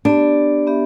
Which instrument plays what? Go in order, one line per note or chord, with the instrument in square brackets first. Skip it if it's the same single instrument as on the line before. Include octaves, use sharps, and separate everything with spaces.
[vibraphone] B3 G4 D5 [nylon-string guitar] D4
[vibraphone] B3 G4 E5